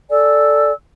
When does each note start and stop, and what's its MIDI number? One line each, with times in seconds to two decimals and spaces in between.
0.10 0.71 69
0.10 0.71 74
0.10 0.71 80
0.10 0.71 88